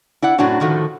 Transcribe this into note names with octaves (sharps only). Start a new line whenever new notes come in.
E4 D5 F#5
F#2 A2 F#3 C4 D4 F#4
A2 D3 D#3 F3 A3 F#4